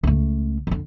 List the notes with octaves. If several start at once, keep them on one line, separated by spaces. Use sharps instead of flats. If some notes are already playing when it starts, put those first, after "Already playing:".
C#2 A3
F2 D3